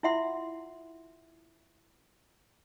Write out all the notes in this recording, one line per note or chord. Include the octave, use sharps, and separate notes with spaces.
E4 F4 E5 F#5 C6